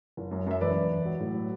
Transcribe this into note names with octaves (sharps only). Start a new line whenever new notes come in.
F#1
F#2
F#2 E5
E1 B4 D5
E1
E1
F#3
A2
F#3